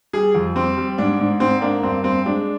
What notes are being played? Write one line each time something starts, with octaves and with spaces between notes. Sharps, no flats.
G3 G#4
F2
G3 C4
G3
G#2 D4
G#2
G#2 C4
A#3 D4
G2 C4
G2 C4
G#3 D4